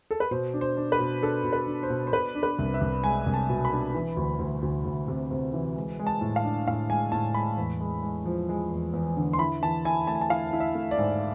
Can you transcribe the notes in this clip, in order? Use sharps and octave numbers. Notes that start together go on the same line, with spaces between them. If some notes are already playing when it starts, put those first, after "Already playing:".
A4
B4
B2 C5
D4
C5
D4
B4
B2
D4 A4
B2
B4
D4
C5
B2
C5
B2 B4
D4
B4
C2
E5
C2
G#3 G#5
C2
A5
B2
B5
D4
E3
D2
D2
D2
D2
C3
C3
E3
G#3
G#3
A5
A2
F5
D4
A2 F5
G#3 G#5
A2 A5
G#3 B5
E2
G#3
G#3
F3
G#3
E2
E2
D3
C6
E4 B5
E3 A5
E4 G#5
A3 A5
G#5
A5
E4 F5
E4
E5
A3
D5
G#2